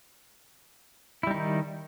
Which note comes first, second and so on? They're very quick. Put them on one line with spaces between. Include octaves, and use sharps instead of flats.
E4 G3 D#4 D#3